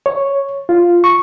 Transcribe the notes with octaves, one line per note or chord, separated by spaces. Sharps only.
C#5
F4
C#6